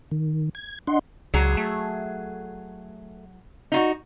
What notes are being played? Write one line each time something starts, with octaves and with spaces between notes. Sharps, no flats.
D#3
G#6
D4 D#5 F#5 C6
C#2 F#3 G#4
A3
D#4 F4 F#4